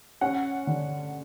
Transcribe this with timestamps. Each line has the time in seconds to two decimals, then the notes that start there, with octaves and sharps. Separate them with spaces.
0.21 C#4 F#5
0.67 D3